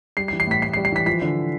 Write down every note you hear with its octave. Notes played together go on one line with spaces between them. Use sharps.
G3 C7
C7
E3
C7
A2 B6
A2 C7
C7
G3
C7
E3 B6
F3 B6
D3